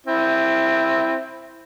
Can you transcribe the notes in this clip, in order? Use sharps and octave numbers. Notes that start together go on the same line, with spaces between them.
C4 E4